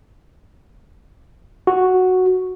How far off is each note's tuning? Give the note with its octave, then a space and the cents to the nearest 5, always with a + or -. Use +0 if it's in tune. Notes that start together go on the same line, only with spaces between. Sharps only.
F#4 -5